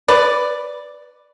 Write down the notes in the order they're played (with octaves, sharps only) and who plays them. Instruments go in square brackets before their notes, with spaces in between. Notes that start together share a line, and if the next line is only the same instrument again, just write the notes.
[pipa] B4 D5